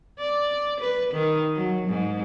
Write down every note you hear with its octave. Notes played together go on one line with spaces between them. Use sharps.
D5
B4
D#3
F#3
G#2